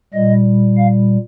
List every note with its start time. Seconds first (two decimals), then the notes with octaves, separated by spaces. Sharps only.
0.13 A#2 G3 D#5
0.78 F5